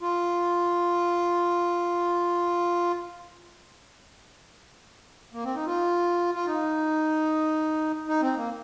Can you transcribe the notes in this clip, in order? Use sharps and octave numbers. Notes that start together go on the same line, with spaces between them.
F4
A#3
C4
D#4
F4
F4
D#4
D#4
C4
A#3